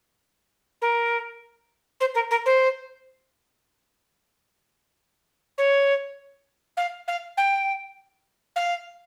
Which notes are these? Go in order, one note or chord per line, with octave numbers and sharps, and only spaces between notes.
A#4
C5
A#4
A#4
C5
C#5
F5
F5
G5
F5